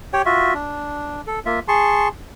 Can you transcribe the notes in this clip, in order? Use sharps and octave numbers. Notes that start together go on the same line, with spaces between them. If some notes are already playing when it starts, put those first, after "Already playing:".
G4 C#5 G5
F4 F#4 E5
D4
A4
A#3 F4 E5
G#4 A5 C6 C#6